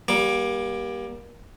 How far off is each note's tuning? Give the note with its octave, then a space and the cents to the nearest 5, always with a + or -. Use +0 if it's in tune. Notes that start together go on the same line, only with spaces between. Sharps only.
G3 +0 A#3 +30 D6 +0